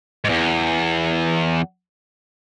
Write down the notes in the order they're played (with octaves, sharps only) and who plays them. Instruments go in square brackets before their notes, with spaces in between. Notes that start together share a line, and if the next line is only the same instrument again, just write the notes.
[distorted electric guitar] E2 G#2